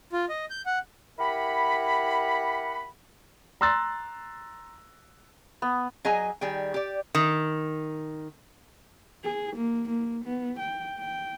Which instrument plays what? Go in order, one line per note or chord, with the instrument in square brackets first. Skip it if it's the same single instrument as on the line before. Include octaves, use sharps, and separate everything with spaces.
[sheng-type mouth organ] F4
D#5
G6
F#5
[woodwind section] E4 G4 A#4 F#5 B5
[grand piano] A#5 C6 E6 F#6 A6
[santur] B3
[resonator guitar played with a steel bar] F#3 G#4 D#5 G#5 A#5
D#3 G3 G#4 G5
G4 D5
D#3
[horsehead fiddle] G#4
A#3
A#3
B3
G5
G5